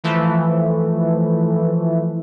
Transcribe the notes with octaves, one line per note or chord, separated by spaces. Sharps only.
E3 F3 A3